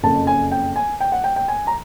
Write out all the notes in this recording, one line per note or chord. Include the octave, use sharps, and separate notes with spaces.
F#1 F2 C#3 A5
G#5
G5
G#5
G5
F#5
G5
G5
G#5
A#5